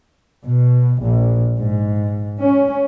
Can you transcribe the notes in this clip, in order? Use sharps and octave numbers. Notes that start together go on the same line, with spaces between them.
B2
A#1
G#2
C#4